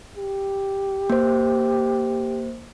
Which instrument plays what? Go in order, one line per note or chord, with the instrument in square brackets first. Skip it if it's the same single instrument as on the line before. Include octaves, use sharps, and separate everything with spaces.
[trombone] G4
[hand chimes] A#3 C5